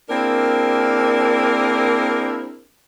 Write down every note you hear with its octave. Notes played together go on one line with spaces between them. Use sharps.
A#3 C4 D4 E4 G#4 A#4